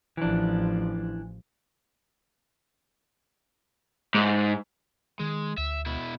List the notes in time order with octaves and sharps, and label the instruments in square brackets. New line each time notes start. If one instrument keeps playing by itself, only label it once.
[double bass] A1 F3 [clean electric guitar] E3 D4
[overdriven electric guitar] G#2
[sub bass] D#3 [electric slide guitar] G#3
[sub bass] D2 [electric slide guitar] E5
[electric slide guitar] B2 E4